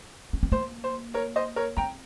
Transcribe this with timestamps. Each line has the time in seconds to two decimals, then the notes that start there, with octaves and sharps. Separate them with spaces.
0.33 C#4
0.43 C4
0.52 A#3 C5
0.84 C5
1.14 A#4 C#5
1.36 C5 D#5
1.56 A#4 C#5
1.77 C4 G5 A#5